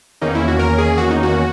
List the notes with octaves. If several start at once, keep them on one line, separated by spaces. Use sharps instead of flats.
E2 D#3 A#3 C#4 D#4
E4
F#4
A#4
G#4
F#4
D#4
F#4